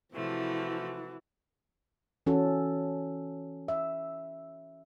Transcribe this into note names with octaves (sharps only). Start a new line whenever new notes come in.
C3 E3 F3 A3 E4 F#4
E3 C#4 F#4 A4
E5